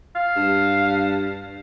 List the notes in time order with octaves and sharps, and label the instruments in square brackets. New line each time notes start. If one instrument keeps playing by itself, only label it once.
[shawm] F5
[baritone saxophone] G2